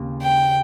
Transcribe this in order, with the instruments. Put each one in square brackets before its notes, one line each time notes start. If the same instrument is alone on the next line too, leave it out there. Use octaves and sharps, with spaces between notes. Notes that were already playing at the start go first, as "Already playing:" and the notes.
Already playing: [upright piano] D#2 C#3
[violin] G5